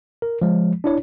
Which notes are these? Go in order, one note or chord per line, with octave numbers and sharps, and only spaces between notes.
A#4
F3 G#3
D4 E4 C#5